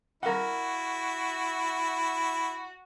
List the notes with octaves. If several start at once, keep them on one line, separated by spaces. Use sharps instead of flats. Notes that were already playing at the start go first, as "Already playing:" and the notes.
E4 F#4 A#4 F5 F#5